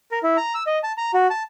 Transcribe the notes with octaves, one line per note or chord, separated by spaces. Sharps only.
A#4
E4
A#5
E6
D#5
A5
A#5
F#4
A5